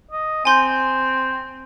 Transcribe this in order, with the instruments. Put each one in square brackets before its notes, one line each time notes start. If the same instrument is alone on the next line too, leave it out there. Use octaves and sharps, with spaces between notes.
[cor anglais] D#5
[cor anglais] C4 [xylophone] G#5 C6 G6